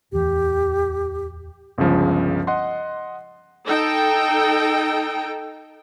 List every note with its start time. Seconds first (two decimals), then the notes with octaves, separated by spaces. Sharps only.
0.12 D1 E2 G4
1.78 G1 C#2 C#3 F3
2.47 D#5 F#5 C6
3.65 D#4 A4 G5